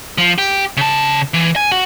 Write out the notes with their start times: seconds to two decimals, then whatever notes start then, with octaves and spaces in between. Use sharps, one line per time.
0.18 F3
0.38 G4
0.77 C#3 A5
1.34 E3
1.56 G#5
1.72 F#4 F#5